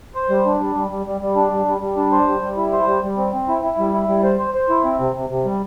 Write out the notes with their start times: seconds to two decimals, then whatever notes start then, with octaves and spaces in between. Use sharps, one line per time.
0.15 C5
0.30 G3
0.46 D4
0.60 G3
0.75 G3
0.91 G3
1.06 G3
1.21 G3
1.36 D4
1.52 G3
1.66 G3
1.81 G3
1.97 D4
2.12 C5
2.27 G3
2.42 G3
2.57 E4
2.72 C5
2.87 G3
3.03 G3
3.17 C4
3.33 C4
3.48 E4
3.63 E4
3.79 G3
3.93 E4
4.08 G3
4.23 C5
4.38 C5
4.54 C5
4.69 E4
4.84 C4
4.99 C3
5.15 C3
5.30 C3
5.45 G3